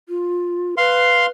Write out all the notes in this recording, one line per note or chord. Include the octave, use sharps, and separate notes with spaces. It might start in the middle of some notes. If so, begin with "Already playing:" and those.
F4
B4 F5 C6